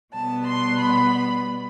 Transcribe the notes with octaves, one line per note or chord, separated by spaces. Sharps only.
B2 G3 B3 A5
C6
B5